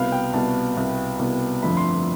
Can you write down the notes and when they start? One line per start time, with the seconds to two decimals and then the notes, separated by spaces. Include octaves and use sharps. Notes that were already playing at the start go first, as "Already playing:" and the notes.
Already playing: C2 B2 B3 F5
0.12 G5
0.34 C2 B2 B3 A5
0.77 C2 B2 B3
1.19 C2 B2 B3
1.63 G1 F2 D3 F3 A3 B5
1.77 C6